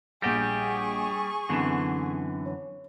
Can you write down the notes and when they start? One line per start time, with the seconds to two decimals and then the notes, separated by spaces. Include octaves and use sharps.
0.22 A#1 G3 G4 G#4 F#5 C#6 A#6
1.49 F#2 D3 E3 B3 C4 E7
2.45 C#5